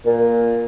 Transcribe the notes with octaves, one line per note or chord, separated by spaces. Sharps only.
A#2